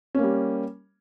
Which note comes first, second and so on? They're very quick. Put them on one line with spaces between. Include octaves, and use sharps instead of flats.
C#4 A#3 G3